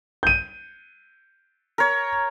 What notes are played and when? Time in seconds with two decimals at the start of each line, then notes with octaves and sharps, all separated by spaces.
0.23 G6 D#7
1.78 A#4 C#5